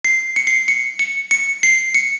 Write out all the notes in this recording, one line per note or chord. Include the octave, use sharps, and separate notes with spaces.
C7
C#7
C7
C#7
C#7
C#7
C7
C#7